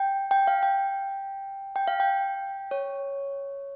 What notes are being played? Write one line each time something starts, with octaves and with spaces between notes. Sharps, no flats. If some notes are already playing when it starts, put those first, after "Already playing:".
Already playing: G5
G5
F5
G5
G5
F5
G5
C#5